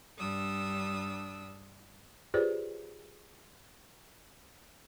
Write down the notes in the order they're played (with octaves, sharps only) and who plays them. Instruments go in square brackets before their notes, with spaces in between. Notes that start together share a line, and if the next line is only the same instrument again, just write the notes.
[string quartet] G2 G3 D4 D#6 E6
[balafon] F4 G4 G#4 B4 C5 D5